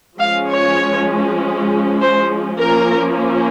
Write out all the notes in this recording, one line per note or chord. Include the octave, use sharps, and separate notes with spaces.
F3 G#3 C#4 F5
C#5
C5
F3 A#3 C#4 A#4